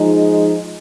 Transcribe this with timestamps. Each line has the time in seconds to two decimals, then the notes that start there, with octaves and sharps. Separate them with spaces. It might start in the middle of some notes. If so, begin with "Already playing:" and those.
Already playing: F3 G#3 D#4